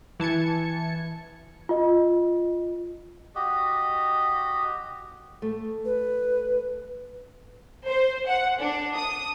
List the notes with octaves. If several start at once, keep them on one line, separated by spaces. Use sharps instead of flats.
E3 A5 G#6 C#7
F4 D#5
F#4 G4 D#5
A3
B4
C5
F#5
D4
D#6